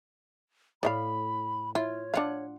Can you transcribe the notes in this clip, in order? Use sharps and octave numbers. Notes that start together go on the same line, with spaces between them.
A2 D5 D#5 F5 B5
E4 F4 C#5
D4 F4 F5 F#5